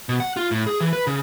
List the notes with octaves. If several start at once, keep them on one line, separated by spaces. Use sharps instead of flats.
B2
F#5
F4
A2
G#4
E3
B4
C#3